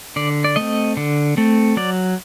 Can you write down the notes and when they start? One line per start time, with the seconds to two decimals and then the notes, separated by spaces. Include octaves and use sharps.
0.16 D3 D5
0.44 D5
0.56 A3 C4 D#5
0.97 D3
1.37 A3 C4
1.77 F#3 D5